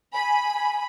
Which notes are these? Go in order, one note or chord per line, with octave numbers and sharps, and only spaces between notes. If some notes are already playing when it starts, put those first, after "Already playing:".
G#5 B5